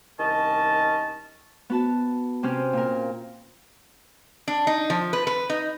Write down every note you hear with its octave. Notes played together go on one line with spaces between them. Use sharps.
C2 D#3 C#4 D#5 A5
B3 F#4 A5
C3 C4 C#4 F6
A#2 A#4
D4
D#4
F3
B4
B4
D#4